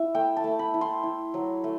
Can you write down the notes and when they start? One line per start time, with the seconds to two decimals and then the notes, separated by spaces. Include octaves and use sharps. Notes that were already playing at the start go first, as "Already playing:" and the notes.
Already playing: E4 E5
0.14 A3 G5
0.37 A5
0.44 A3
0.59 B5
0.74 E4
0.81 C6
1.03 E4
1.34 F#3
1.64 A3